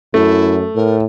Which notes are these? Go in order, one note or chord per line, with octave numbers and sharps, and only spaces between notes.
F#2 A3 E4
A2 A#4